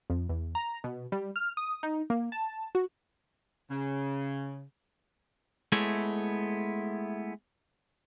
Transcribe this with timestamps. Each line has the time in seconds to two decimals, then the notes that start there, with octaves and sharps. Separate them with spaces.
0.10 F2
0.29 E2
0.55 A#5
0.84 B2
1.12 G3
1.36 F6
1.57 D#6
1.83 D#4
2.10 A#3
2.32 A5
2.75 F#4
3.70 C#3
5.72 G#3 A3 B3 E4 C#5